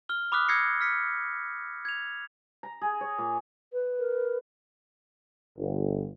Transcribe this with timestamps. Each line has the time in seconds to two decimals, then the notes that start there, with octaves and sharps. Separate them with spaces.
0.09 F6 G7
0.32 B5 D6 D#6 F6 F#6 B6
0.49 E6 G6 G#6 A#6 C7 C#7
0.81 F6 B6 C#7
1.85 G#6 F7
2.63 A#5
2.82 G#4
3.01 C#5
3.18 A#2
3.73 B4
3.99 A#4
5.57 G1